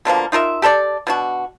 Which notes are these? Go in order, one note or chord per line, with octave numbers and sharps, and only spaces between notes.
B2 D3 F3 A#3
D#4 F4 A#4 E5
G4 A4 C5 D5
B2 D4 F#4